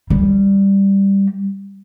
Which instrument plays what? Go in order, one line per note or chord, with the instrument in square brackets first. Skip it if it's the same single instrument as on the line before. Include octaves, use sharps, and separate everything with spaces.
[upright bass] G3